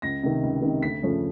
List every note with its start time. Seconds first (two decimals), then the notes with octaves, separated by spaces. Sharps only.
0.02 C#2 A#6
0.23 C3 D#3
0.43 C#2
0.62 C3 D#3
0.82 D2 B6
1.02 C#3 F3 A3 C#4